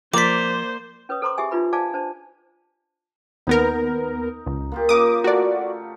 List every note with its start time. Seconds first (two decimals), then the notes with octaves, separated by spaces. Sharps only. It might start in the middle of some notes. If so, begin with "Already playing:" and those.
0.14 F3 A#3 C5 D5 D6 B6
1.09 C#4 B4 C#5 D#6
1.22 A4 C5 A#5 C6 D6
1.38 G4 G#4 E5 G#5
1.51 D4 D#4 F4 B4 B5
1.73 C5 D5 F5 G#5 A5 D6
1.94 D4 C5 A5
3.47 D#2 B3 D#4 A#4
4.46 C#2
4.72 A#3 F4 G4
4.89 C#3 A#3 A#4 D6 D#6
5.24 A3 F#4 D5